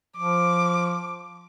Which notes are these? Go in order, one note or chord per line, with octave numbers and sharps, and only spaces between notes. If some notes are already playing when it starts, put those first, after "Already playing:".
F3 D6